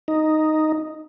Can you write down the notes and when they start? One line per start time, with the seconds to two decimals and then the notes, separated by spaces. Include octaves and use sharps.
0.08 D#4